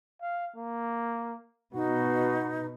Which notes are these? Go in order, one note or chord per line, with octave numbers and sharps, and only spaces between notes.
F5
A#3
B2 D#4 F#4